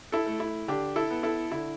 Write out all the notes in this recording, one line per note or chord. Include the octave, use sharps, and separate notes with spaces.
E4 A4
A3
E4
D3 D4 G4
E4 A4
B3
E4 A4
D3 E4